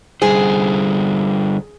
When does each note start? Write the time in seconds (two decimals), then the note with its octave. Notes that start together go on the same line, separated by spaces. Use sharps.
0.22 D3 G3 G#4 C5